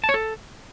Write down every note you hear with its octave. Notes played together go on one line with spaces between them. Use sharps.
A5
C#5
A4